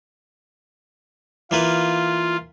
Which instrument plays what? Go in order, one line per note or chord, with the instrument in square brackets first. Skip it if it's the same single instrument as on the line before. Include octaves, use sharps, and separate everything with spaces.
[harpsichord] E3 A#3 B4 [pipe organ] F4